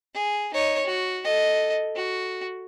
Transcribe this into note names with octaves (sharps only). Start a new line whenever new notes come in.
G#4
D#4 C#5
F#4
A4 D#5
F#4